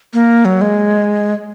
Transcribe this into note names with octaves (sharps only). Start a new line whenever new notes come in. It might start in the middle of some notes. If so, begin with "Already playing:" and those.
A#3
F#3
G#3